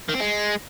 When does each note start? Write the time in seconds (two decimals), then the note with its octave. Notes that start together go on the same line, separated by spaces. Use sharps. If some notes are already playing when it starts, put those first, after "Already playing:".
0.09 D#3
0.15 C4
0.20 G#3